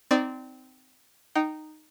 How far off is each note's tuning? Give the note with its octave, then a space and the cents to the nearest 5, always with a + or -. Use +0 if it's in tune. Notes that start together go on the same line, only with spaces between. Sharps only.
C4 -20 D#4 +0 D5 +0
D#4 -10 G5 -25